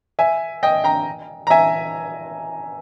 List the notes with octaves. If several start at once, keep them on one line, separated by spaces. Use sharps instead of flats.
E5 G#5
D#5 G5
G5 A#5
A#5
E5 G#5